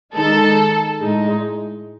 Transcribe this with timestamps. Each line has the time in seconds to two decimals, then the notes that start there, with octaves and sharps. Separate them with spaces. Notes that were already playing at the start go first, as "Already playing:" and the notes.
0.15 D#3 G#3 D#4 A4
1.00 A2 G#3 D#4